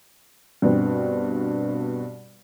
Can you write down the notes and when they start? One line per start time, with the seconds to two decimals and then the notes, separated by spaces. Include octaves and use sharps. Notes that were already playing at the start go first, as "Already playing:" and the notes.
0.62 G2 B2 C4